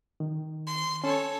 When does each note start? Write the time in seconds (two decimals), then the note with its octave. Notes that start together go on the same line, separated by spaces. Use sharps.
0.20 D#3
0.67 C6
1.04 C#4 A4 C#5